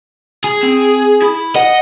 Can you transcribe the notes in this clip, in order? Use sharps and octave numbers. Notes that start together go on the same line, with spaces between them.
G#4
C4
E4
D#5 F#5